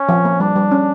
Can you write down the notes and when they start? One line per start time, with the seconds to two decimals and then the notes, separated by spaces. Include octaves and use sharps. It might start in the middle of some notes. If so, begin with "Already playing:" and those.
Already playing: C#4
0.09 F3
0.25 A#3
0.40 G3 D4
0.56 G3
0.71 C#4